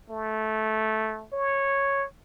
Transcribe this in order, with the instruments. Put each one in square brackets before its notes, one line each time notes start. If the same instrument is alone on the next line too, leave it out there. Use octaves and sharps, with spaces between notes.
[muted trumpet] A3
C#5